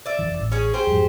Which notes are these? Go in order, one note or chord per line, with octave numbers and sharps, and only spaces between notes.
D5 E5
F1 C2 E3
A1
C#4 G#4
G4 G#4 C5
F2 G#2